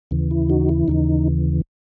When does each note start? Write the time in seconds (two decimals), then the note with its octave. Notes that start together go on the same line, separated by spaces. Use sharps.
0.11 D#2 C#3 E3
0.31 E4
0.50 D#4 F#4
0.69 E4
0.88 D#2 C#3 E3 D#4